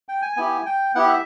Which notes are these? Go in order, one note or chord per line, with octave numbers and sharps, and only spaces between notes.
G5
G#5
B3 E4 G4 G#5
G5
B3 E4 G4 F#5
E5